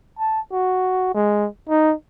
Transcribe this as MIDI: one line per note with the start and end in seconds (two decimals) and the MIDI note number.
0.19 0.40 81
0.52 1.11 66
1.14 1.48 56
1.69 1.93 63